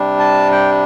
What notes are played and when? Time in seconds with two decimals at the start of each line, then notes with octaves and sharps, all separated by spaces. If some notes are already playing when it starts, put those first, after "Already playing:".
Already playing: C3 G3 D4
0.20 A5
0.52 G5